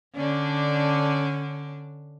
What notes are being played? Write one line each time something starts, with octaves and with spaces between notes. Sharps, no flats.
D3 C#4 D4